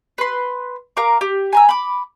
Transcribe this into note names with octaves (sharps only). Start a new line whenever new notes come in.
B4 C6
A#4 F5 A#5 D6
G4
G#5 A#5 E6
B5 D6